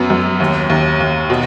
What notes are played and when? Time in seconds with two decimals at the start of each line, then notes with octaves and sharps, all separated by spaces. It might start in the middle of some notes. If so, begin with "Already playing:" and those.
Already playing: F#2 B3
0.10 F#2
0.40 D#2
0.70 D#2
1.00 D#2
1.30 B2